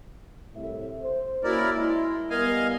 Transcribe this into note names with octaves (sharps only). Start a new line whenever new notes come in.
C2 A2 E5
C5
A#3 C#4 E4 F#4 A#4 D5
G#3 E4
G3 B3 A#4 D#5 F5 G#5